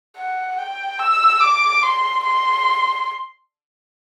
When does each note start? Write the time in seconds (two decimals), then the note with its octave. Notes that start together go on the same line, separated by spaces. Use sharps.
0.16 F#5
0.58 G5
0.99 E6
1.40 D6
1.83 C6
2.24 C6